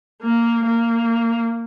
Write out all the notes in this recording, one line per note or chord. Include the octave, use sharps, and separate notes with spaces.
A#3
A#3